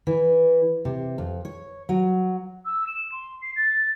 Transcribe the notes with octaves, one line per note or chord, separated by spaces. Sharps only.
E3
C3
F2
C#5
F#3
E6
E7
C6
C7
A6